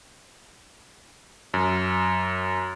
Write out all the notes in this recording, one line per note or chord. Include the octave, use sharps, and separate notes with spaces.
F#2